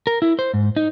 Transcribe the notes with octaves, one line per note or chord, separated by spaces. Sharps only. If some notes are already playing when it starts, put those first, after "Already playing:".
A#4
E4
C5
G#2
D#4